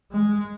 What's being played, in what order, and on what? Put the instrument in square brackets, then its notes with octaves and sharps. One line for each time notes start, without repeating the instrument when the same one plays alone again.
[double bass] G#3